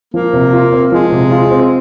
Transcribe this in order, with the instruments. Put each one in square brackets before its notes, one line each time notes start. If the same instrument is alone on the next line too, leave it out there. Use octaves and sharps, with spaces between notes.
[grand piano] F3 [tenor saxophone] A#3
[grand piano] C3
F4
C4
[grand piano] F3 [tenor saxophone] G#3
[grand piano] C3
F4
C4